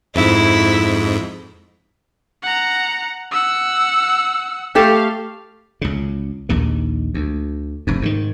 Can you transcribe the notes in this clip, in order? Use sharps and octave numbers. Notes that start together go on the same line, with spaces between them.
F2 G#2 E4
F#5 A#5
F#5 E6
A3 G4 A4 F5
C#2 C#3
A#1 D#2 D#3
D2
F1 G2
G#2 D3 D#3